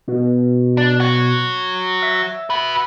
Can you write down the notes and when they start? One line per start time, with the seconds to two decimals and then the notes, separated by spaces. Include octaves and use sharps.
0.08 B2
0.77 D4
1.00 F#4 C#5
2.02 E5
2.50 F#4 B4